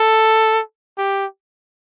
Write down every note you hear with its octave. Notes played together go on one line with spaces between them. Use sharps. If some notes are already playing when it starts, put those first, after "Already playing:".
Already playing: A4
G4